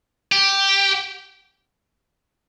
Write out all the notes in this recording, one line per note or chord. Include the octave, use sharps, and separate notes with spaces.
G4